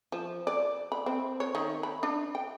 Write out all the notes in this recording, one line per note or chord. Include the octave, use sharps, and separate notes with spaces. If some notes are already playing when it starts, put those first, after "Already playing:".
F3
D5
B5
C4
C#5
D#3
B5
D4
G5